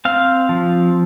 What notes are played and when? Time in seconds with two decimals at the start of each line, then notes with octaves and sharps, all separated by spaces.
0.05 C4 F5
0.49 F3